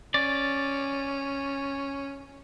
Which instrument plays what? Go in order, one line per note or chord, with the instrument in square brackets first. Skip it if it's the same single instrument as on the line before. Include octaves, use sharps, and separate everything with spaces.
[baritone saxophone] C#4 [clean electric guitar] D5